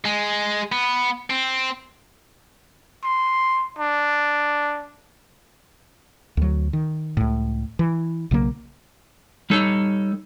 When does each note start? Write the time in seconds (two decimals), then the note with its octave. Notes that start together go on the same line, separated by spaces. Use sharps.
0.05 G#3
0.72 B3
1.30 C4
3.03 C6
3.79 D4
6.37 D2 F#3
6.73 D#3
7.17 C#2 A2
7.79 E3
8.31 B1 C#3 F#3 A#3
9.50 G3 D#4 A4 C#5